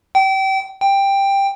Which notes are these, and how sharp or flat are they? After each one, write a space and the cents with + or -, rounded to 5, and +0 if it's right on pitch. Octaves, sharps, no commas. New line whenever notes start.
G5 -30
G5 +10